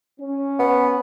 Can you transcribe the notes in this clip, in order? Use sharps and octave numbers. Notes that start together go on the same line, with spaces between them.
C#4
B3